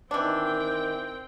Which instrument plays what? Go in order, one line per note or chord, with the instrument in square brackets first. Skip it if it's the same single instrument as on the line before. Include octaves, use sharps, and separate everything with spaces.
[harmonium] D#3 [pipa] E3 D4 [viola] C4 G5